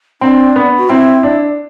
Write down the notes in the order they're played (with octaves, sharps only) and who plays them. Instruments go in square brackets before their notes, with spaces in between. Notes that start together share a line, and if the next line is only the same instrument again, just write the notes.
[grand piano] C4 [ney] D4
[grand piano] B3
[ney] F#4
[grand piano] C4 [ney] E4
[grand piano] D4